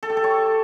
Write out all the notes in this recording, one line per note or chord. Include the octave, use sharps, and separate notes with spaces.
A4
G4
A4
C#5